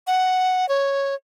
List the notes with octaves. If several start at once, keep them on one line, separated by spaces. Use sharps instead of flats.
F#5
C#5